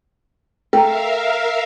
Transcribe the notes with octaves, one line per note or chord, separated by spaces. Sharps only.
A3 A#4 E5 F5 G5 A#5